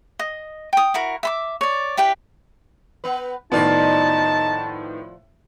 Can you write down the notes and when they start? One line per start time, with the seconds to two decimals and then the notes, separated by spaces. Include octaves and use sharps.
0.19 D#5
0.73 G5 D#6
0.94 E4 F#4 A#4
1.23 E5 B5 D6
1.61 C#5 D5
1.97 E4 G4 B4 G5
3.04 B3 B4
3.52 F2 A2 D#3 B3 D#4 F4 D5 A5